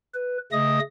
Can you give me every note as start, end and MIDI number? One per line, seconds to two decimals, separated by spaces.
0.15 0.38 71
0.52 0.79 49
0.52 0.79 57
0.52 0.79 75
0.52 0.79 87